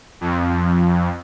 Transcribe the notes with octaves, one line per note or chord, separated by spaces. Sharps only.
F2